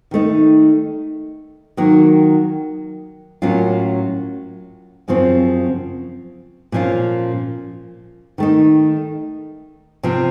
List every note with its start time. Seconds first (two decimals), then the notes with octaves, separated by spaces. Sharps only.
0.11 D#3 A3 D#4
1.77 D#3 F#3 A#3
3.42 A2 F#3 A#3 C#4 F4
5.08 F#2 C#3 F3 C4
6.72 A#2 F3 A#3 C#4 F4
8.38 D#3 A3 D#4
10.03 C3 F3 C4